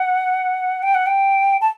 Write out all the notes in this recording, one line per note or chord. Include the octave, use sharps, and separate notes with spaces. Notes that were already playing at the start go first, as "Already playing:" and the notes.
Already playing: F#5
G5
F#5
G5
A5